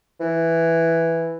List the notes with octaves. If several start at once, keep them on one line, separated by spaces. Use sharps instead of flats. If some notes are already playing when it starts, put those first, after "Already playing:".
E3